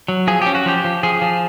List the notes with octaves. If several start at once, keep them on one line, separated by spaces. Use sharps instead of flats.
F#3
F3 G#4
C#4 G4
F#4
F3 G4
F3
F3 G#4
F3